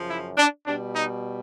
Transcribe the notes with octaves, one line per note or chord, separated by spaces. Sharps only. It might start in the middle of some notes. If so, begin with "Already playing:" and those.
Already playing: F#2 C#3 F3
E4
D4
B2 G3 D4
D#4